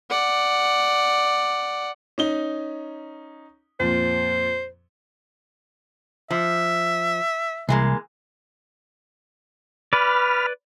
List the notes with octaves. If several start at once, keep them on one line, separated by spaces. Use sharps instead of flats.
D5 F#5
C#4 D#4 G7
F2 A#2 C5
F3 E5
C2 E3 G#3 A#3
B4 D5 B5 F6